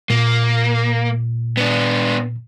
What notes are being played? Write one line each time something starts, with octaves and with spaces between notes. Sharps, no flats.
A#2 A#3
B3 D4